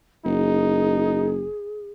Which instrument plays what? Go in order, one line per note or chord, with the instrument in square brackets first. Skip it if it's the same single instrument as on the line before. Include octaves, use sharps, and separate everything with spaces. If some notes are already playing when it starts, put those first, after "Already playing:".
[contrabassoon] F#1 [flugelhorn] D#4 [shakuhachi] G#4